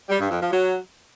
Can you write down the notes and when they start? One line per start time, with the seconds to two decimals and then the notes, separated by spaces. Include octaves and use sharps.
0.09 G3
0.20 G2
0.30 F2
0.40 F3
0.51 F#3